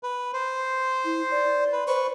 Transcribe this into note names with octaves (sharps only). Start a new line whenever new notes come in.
B4
C5
E4
D5
B4
B4 C5 C#6